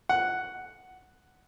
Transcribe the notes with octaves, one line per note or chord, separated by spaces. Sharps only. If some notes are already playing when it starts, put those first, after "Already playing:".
F#5